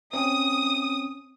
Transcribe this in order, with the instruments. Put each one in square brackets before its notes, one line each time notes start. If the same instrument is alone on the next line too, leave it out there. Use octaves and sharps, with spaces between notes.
[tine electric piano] C4 C#4 [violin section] D#6